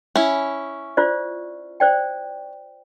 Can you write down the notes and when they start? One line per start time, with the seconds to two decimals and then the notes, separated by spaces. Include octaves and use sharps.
0.16 C#4 E4
0.97 F4 C5 D5
1.80 C5 D5 G5